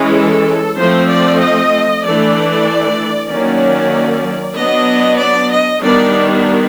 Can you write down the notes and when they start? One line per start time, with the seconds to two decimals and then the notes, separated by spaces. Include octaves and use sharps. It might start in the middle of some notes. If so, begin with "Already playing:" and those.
Already playing: E3 G#3 C#4
0.14 A4
0.78 F3 A3 C4 C5
1.10 D5
1.40 D#5
2.04 E3 A3 D4 D5
3.30 D#3 F#3 A#3 C#4 D5
4.56 F#3 B3 D4 D#5
5.20 D5
5.51 D#5
5.82 D#3 G3 B3 D4 D5